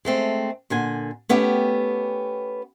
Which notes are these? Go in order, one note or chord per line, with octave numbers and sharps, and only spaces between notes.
G#3 A3 C4
A#2 D3 G#5
A3 B3 C#4 G4